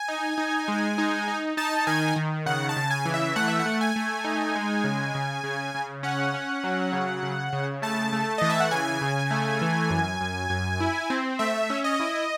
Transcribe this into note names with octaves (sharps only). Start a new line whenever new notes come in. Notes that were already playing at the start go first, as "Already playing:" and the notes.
Already playing: G#5
D#4
D#4
G#3
D#4
D#4
D#4 A5
D#3 G#5
D#3
C#3 F#5
A5
C#3
G#5
E3
E5
A3 F#5
E5
F#5
A3
G#5
A3
D#4
G#3
C#3
C#3
C#3
C#3
C#4 F#5
C#4
F#3
C#3
C#3
C#3
A3 A5
A3
E3 D#5
E5
F#5
C#3 G#5
C#3
A3
E3
F#2
F#2
F#2
E4
C4
A3 E5
C#4
D#5
E4